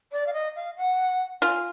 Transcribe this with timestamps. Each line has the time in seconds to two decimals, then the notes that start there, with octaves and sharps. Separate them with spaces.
0.12 D5
0.27 F5
0.33 D#5
0.55 F5
0.77 F#5
1.42 F4 G#5